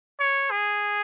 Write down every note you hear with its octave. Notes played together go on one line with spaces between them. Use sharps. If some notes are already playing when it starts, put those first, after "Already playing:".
C#5
G#4